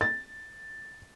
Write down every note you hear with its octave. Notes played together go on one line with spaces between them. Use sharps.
A6